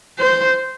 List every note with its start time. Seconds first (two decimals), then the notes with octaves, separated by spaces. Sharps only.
0.19 C5